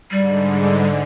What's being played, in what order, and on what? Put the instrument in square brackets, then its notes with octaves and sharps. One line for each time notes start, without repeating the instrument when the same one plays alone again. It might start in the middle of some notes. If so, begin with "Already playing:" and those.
[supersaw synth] G#2 D3 [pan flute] G3